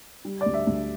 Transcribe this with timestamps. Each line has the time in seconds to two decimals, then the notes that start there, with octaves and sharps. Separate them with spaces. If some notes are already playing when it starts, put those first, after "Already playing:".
0.25 G3
0.41 D5
0.46 D2
0.54 E5
0.67 D2